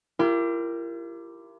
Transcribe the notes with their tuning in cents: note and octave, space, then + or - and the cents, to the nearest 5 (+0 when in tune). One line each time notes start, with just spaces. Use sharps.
E4 +45 G4 +0 A#4 +0